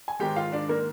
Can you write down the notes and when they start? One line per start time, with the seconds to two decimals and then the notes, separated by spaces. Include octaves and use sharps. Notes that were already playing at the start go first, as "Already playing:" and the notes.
0.08 G#5
0.19 G#2 D#3 G#3 G4 G5
0.36 F4 F5
0.52 D4 D5
0.69 A#3 A#4